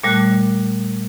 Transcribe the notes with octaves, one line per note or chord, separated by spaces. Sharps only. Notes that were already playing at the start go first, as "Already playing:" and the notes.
A#2 G3 A3 F#6